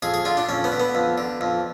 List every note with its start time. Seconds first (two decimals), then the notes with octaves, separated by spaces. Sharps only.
0.02 F2 G#4
0.14 G#4
0.25 D3 F4
0.37 D4
0.49 F2 C#4
0.64 B3
0.72 D3
0.80 B3
0.95 F2
1.18 D3
1.41 F2